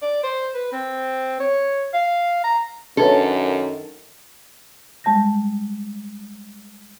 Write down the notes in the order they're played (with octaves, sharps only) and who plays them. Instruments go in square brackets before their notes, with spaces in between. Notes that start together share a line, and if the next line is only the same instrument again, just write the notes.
[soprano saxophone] D5
C5
B4
C4
C#5
F5
A#5
[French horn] F#2 [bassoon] D#3 [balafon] D4 B4 C#5 [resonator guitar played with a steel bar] A4
[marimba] G3 G#3 A5 G6 A#6